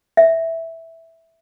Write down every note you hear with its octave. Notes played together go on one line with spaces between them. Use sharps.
E5